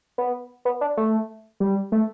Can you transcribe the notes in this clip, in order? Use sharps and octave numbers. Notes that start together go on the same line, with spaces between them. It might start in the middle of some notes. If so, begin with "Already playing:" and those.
B3
B3
D4
A3
G3
A3